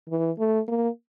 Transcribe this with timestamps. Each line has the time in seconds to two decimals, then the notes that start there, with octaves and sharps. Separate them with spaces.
0.09 E3
0.39 A3
0.68 A#3